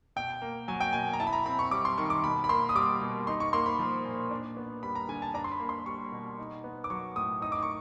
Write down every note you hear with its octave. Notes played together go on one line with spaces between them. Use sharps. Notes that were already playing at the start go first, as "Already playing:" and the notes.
B2 G5
A#3
F#3 G#5
G5
B2 G#5
A#5
E4 A5
B5
A#5
C4 B5
C#6
G3 D6
C6
D#3 C#6
D6
B2 B5
B5
A#3 C6
D#6
G3 D6
B2
D#4 C6
C#6
A#3 C6
B5
F3
A#2
D4
B3
G3 B5
A#5
D3 G#5
A5
D4 A#5
C6
B5
A#3
C6
G3 C#6
B2
D#4
B3
D6
F#3 C#6
A2 D#6
D#4 D#6
D6
C#6